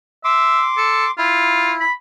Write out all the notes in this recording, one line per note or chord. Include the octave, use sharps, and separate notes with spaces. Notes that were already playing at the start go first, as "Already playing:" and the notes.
E5 C6 D6
A4
E4 F4
B5